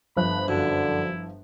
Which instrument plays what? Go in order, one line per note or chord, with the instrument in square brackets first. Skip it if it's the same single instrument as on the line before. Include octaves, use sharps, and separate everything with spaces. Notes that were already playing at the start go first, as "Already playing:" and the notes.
[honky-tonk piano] G1 F3 F#6 [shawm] B5
[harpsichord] F#2 [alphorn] D3 [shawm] E4